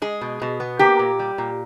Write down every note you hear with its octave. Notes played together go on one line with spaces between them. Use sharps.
G#3 G#4
B2
B2
B3
A#3 G4
A#2
G3
A#2